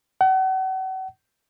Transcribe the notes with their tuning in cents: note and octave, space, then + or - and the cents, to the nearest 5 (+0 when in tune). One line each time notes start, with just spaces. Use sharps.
F#5 +40